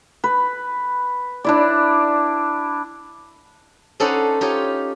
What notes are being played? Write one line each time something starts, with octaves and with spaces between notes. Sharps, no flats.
B4
D4 E4 D5
C#4 D#4 A4 C5 D5 F#5
D#4 F4 G4 C#5